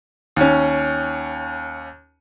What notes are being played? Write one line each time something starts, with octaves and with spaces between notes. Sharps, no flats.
D#2 C#4